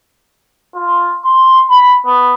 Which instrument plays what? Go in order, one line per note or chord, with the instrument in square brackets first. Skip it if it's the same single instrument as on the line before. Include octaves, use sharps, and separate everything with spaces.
[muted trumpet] F4
C6
B5
B3